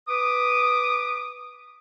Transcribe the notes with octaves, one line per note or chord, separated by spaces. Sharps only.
B4 D6 D#6